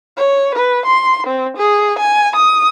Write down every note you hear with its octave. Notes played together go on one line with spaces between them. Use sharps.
C#5
B4
C6
C4
G#4
G#5
D#6